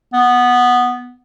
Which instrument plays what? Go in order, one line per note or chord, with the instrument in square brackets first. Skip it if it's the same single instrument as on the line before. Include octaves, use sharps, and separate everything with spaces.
[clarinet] B3